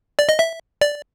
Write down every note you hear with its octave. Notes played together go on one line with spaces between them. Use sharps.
D5
D#5
E5
D5